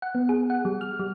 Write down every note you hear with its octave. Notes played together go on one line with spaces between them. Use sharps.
F#5
B3
G#4
F#5
G3
F6
G3